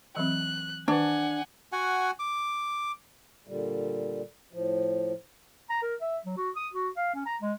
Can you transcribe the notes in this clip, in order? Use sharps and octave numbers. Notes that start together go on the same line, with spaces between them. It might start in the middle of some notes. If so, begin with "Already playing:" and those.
E3 F#3 C4 F#6
D#3 D4 B4 F#5 G#5
F#4 F#5 G#5
D6
A#2 D3 G3
A2 F3
A#5
A#4
E5
F#3
F#4
D#6
F#4
F5
C#4
A#5
G#3